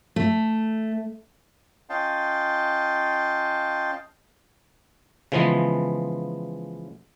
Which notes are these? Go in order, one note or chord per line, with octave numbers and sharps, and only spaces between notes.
A3
C#4 F4 D#5 F5 G5 A5
C#3 E3 F3 G#3 B3